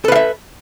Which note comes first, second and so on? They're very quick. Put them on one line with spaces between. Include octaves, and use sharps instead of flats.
A4 B4 F5 E5